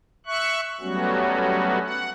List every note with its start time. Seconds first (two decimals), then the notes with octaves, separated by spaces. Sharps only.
0.26 E5 C#6 F#6
0.81 F#3 G3 A3 B3 C#4 F#4
1.80 F#5